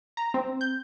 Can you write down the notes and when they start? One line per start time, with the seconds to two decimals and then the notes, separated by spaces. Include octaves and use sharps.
0.17 A#5
0.34 C4
0.61 G6